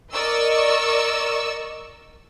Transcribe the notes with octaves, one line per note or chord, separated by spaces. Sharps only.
A#4 D5 D#5 C#6 E6